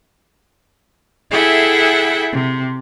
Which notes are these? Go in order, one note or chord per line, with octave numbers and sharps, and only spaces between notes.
E4 G#4 A4 E5 F#5 G5
C3